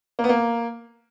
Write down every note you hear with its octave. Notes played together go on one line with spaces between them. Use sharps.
A#3
B3
A#3